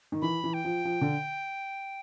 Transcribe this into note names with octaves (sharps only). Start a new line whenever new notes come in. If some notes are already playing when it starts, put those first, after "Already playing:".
D#3
E3 B5
E3
G5
F3
F3
D3